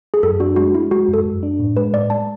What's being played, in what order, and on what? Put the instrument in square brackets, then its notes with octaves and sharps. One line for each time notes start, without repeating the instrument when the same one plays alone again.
[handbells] G#4
[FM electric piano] F#2 [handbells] A4
[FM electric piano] D4 [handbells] F#4
[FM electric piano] G#3 [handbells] F#4
[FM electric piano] G#3 [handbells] E4
[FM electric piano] G#3 [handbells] F#4
[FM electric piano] F#2 [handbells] A4
[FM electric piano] F#2
D4
A2
[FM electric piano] G#3 [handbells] B4
[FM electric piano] A2 [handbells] D5
[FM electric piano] G#3 [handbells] A5